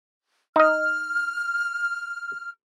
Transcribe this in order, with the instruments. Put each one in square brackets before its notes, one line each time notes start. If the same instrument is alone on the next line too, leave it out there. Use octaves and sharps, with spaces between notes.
[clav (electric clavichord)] D#4 D#5 [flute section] F6